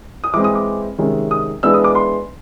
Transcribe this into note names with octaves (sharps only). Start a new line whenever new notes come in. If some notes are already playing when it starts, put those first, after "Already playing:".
D#6
E3 G#3 C4 D6
D#6
D6
C3 D#3 G#3 C#4
D#6
E3 G#3 B3 D4 E6
D#6
D6
C6